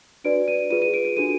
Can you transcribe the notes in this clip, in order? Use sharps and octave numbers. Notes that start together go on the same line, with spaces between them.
D4 F#4 B4 D5 D7
D#7
F4 G#4 B4 D#7
D#7
D7
D7
D4 F#4 A4 D#7